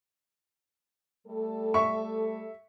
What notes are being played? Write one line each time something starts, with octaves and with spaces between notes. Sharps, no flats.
G3 A3 A4
E5 C#6